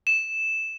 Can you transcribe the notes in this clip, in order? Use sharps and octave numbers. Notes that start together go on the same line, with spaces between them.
E7